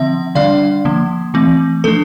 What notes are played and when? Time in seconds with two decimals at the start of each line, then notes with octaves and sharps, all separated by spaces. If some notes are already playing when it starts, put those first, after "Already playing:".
Already playing: D3 F3 C4 E5
0.35 D3 G3 D4 D5 F5
0.85 D3 F3 A#3
1.34 E3 A3 C4
1.84 F3 A3 D4 A4